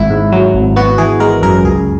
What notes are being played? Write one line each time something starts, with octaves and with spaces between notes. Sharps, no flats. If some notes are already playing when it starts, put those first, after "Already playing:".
Already playing: G#1 G#2 E4
G#2
F#3
G#1
B3 F#4
E3 G#4
G#3 A#4
F#2 A#4
C#2 G#4